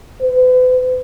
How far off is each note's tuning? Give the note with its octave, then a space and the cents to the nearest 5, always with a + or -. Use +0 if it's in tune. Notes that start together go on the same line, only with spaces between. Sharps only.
B4 +40